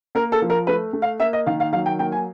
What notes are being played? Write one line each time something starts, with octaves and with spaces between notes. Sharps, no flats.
A#3 A#4
A4
F3
A#4
A3 B4
A3
F5
A#3 E5
D#5
D#3 F5
F5
F#3 F5
G5
A#3 G5
G#5